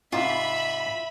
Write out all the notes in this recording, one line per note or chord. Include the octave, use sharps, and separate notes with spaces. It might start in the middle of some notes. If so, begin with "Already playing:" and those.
G#2 C3 F4 E5 B5